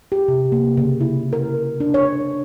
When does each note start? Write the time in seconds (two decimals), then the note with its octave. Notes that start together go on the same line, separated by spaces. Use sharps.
0.12 G4
0.28 C3
0.52 A#3
0.77 C#3
1.01 E4
1.33 A#4
1.80 D4
1.94 C#5
2.21 D4